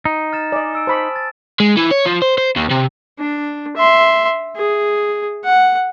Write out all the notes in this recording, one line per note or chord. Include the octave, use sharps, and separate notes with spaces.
D#4
F6 A6 E7
D5 D#5 G#5
D#6 E6 D7
C5 A5 B5 C#6 F6 D7
A6
G#3
E3
C#5
F3
C5
C5
D#2
C3
D4
E5 C6
G#4
F#5